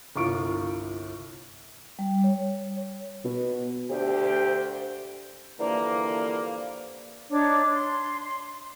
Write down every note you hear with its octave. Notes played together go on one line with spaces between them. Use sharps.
G1 C2 F4 C#6 D7
G3
C#5
B2
D2 G4 C5
D3 E3 F3 G3 A#3
D4 D#4 C#5 D6
C6